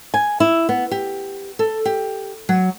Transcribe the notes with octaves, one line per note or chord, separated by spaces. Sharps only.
G#5
E4
B3
G4
A4
G4
F#3